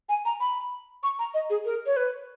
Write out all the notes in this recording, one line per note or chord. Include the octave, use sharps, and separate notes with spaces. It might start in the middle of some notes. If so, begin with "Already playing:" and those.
G#5
A#5
B5
C#6
A#5
D#5
G#4
A#4
C#5
B4